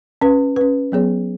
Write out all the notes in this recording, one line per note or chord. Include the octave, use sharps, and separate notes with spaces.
C#4 B4
C#4 B4
F#3 B3 G#4 C#5